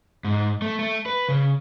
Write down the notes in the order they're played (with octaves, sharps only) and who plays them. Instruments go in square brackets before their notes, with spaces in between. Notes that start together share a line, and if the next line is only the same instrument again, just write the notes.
[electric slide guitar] G#2
A3
A3
B4
C#3